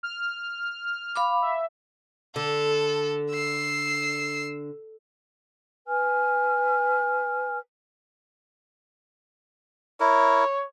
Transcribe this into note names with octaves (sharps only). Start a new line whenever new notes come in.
F6
F5 B5 D6
E5
D3 A4
E6 C7
B4 G#5 F6
E4 A#4 C#5